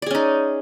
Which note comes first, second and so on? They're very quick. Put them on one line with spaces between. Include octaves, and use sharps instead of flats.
D5 G#4 C#4 D#4